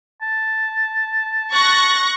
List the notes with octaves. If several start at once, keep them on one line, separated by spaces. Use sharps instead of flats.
A5
C#6 F#6 A#6